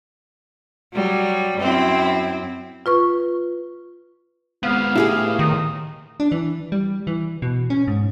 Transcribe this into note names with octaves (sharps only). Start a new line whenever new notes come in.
F#3 G3
F#2 C4 E4
F4 B4 C#6
G#3 B3 C4 F5
A2 E4 G4 G#4
D#3 D#6
D4
E3
G3
E3
B2
C#4
G#2